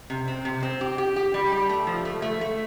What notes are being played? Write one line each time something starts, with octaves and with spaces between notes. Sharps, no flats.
C3
C4
C3
C4
G4
G4
G4
G3
G4
A3
F3
A3
A3
A3